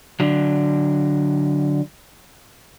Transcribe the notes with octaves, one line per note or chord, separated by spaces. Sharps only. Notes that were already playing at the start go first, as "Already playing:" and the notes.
D3 F#3